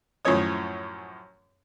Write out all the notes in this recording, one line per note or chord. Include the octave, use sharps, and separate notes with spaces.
F#2 A2 F3 C#4 C#5 D#6